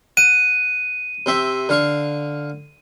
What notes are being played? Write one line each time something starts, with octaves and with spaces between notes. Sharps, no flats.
F#5 D#7
C3 C4 E5
D3 F5 C#6